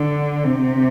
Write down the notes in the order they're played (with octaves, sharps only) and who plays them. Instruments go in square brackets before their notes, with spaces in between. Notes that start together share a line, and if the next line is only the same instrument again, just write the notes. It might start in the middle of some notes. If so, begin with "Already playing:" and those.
Already playing: [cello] D3
C3